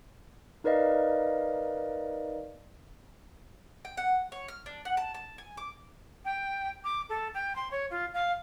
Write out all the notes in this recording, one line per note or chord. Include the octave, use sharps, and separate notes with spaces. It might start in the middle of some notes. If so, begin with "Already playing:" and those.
D#4 A#4 B4 D5 D#5 F5
G5
F#5
C#5
F6
D4
F#5
A5
A5
G#5
D6
G5
D6
A4
G5
C6
C#5
F4
F5